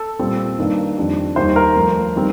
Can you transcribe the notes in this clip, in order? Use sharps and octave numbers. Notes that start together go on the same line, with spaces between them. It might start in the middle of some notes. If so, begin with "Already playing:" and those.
Already playing: A4
A#2 G3 C4
G2 D#3 A#3 D4
F2 D#3 G3 D4
D#2 D#3 G3 C5
A#4
G2 F3 A3
D#3 G3 C4